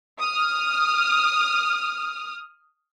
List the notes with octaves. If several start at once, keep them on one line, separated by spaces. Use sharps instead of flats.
D#6 F6